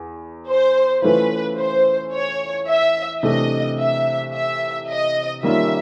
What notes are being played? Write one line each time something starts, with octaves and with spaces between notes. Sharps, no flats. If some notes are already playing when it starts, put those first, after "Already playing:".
Already playing: E2
C5
E3 A3 C#4 F4 B4
C5
C#5
E5
C3 E3 A3 D4 D#5
E5
E5
D#5
D#3 G3 A#3 C#4 F4 E5